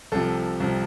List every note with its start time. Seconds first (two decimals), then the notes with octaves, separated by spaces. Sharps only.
0.12 C2 C3 F3 A4
0.60 C2 C3 F3